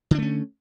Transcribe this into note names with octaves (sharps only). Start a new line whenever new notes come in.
D3 A3 C#4 D4